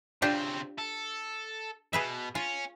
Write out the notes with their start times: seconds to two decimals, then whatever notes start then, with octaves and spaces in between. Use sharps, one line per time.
0.22 C#3 C4 D4 F4 G4
0.78 A4
1.93 B2 G#4 B4 E5
2.35 C#4 F4